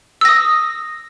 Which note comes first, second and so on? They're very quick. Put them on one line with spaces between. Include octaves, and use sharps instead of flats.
E6 A#6 D#6